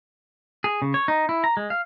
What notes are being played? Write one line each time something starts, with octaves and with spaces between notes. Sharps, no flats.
G#4
C#3
C#5
D#4
E4
A#5
G#3
F5